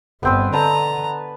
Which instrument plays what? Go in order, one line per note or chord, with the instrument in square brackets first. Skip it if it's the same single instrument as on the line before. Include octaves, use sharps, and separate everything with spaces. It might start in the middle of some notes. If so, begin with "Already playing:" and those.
[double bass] G1 [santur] B3 C4 B4
[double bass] D3 [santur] B4 A5 [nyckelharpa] A#5